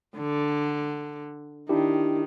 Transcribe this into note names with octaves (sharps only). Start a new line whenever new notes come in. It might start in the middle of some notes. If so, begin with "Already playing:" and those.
D3
D#3 D4 E4 G4